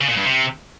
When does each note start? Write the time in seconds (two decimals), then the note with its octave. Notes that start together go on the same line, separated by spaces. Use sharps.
0.01 C#3
0.09 A#2
0.17 G2
0.25 C3